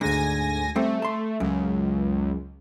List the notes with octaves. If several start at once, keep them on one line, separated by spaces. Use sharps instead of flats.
D2 G#2 D3 G#5 A#6
G3 A3 C4 A4
A5 C6
C#2 F#2